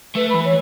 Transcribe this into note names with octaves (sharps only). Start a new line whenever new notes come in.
A3 B4
E3 B5
C#5